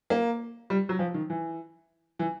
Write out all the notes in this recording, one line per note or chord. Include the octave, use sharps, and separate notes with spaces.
A#3
G3
F#3
F3
D#3
E3
E3